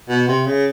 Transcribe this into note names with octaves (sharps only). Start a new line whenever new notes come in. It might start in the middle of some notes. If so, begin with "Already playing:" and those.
B2
C3
C#3